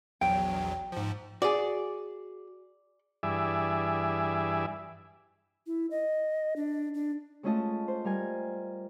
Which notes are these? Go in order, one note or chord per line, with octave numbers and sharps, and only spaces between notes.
A#1 E2 F#3 G5
G#2 F3
F#4 G#4 D5
G2 E3 G#4 D5 E5
E4
D#5
D4
D4
G#3 A3 C#4 F4 D#5 A5
C5
G3 A#4 G#5